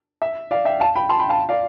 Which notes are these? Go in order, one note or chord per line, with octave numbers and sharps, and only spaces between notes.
E5
D5 F5
E5 G5
F5 A5
G5 B5
A5 C6
G5 B5
F5 A5
D5 F5